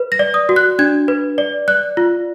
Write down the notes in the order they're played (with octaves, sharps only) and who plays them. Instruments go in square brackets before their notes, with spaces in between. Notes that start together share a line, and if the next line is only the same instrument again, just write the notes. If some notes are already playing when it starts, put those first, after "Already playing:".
Already playing: [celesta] B4
A#6
D5
D#6
F#4
F#6
D4 G#6
B4
D5
D5 F#6
F4